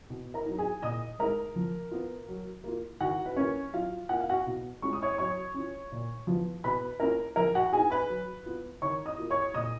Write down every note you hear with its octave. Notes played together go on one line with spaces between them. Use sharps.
B2
A#4 A#5
F#3 B3 D#4
G#4 G#5
A#2 D#5 D#6
G#3 D#4 A#4 A#5
F3
B3 F4
F#3
A#3 F4
D#3 F#4 F#5
B4
A#3 C#4 F4 C#5
F#3 F4 F5
A#3 F4 F#5
F5
F#4 F#5
B2
G#3 C#4 F4 C#6
D#6
C#5 C#6
F#3 C#5 C#6
C#4 F4
A#2
F3 B3 F4
B2 B4 B5
A#3 C#4 F4 A#4 A#5
F3 A#4 A#5
F#4 F#5
B3 D#4 G#4 G#5
B4 B5
F#3
B3 F4
D#3 C#5 C#6
D#5 D#6
A#3 F4
C#5 C#6
A#2 D#5 D#6